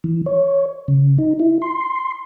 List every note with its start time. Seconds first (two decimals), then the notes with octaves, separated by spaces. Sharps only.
0.04 E3
0.26 C#5
0.88 C#3
1.18 D#4
1.40 E4
1.62 C6